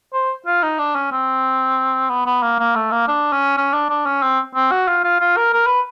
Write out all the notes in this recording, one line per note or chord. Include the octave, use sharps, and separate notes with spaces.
C5
F4
D#4
D4
C#4
C4
B3
B3
A#3
A#3
A3
A#3
D4
C#4
C#4
D4
D4
C#4
C4
C4
F#4
F4
F4
F4
A#4
A#4
B4